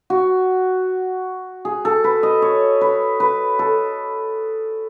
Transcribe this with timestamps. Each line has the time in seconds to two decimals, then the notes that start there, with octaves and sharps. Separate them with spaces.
0.10 F#4
1.65 G#4
1.85 A4
2.04 B4
2.23 D#5
2.42 C#5
2.81 B4
3.20 B4
3.59 A4